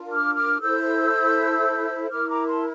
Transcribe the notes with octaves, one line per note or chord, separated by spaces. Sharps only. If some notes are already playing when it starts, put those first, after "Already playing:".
Already playing: D4 F4 A#4
D6 F6
D6 F6
E4 A4 C5 E6 G6
E4 A#4 D6 F6
A#5 D6
A5 C6